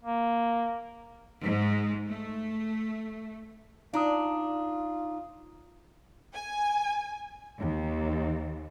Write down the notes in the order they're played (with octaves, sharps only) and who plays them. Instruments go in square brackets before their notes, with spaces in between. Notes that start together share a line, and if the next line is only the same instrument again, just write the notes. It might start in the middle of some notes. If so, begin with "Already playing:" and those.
[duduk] A#3
[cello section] G#2
A3
[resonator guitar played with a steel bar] D4 [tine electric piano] D#4 A#5 D#6 [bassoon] F4
[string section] G#5
D#2